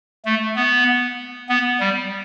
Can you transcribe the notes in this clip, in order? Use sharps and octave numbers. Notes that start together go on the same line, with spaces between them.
A3
B3
B3
G3